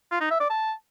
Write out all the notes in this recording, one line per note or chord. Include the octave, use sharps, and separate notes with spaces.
F4
D#4
E5
D5
A5